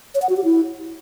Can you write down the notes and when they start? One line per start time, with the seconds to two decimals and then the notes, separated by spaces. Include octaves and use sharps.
0.15 C#5
0.22 F#5
0.29 F#4
0.37 G4
0.44 E4